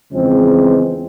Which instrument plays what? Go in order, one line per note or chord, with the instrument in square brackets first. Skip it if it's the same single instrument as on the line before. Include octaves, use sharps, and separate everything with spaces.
[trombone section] E2 C#3 F3 G#3 C4